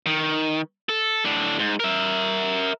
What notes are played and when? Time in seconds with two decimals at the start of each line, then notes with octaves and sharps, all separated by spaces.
0.06 D#3
0.89 A4
1.25 A2 D4
1.59 G#2
1.80 A#4 E5